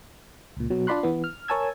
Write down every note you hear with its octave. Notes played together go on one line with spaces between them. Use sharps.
C#2 A#2
B2 F#3
D4 F4 D5 B5 C6 F#6
E3 B3
F6
A#4 C#5 G#5 A5 E6 G#6